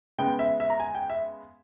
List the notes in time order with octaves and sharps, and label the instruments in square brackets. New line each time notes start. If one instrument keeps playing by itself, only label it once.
[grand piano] C#3 G#3 B3 G5
E5
E5
A#5
G#5
G5
E5